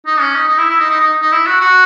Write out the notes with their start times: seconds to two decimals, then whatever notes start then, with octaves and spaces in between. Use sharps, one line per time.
0.07 D#4
0.20 C#4
0.35 D#4
0.48 D#4
0.58 E4
0.70 E4
0.80 D#4
0.90 D#4
1.00 D#4
1.22 D#4
1.32 E4
1.46 F#4
1.61 F#4